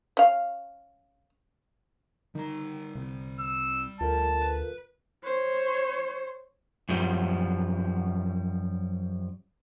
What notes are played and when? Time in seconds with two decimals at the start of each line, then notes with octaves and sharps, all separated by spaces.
0.17 C#4 F5
2.35 D3 D#3 G3 A#5
2.95 C2
3.39 E6
4.01 D2 F4 A4 A#4 A5
4.42 B4
5.24 C5 C#5
6.89 F#2 F3 G3